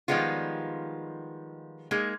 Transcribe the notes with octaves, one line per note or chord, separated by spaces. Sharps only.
D#3 F3 G3 G#3 B3 F4
G#3 A#3 D#4 G#4